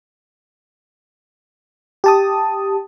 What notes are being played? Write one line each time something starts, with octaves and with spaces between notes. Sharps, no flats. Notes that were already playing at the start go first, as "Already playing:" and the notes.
G4 A5 D#6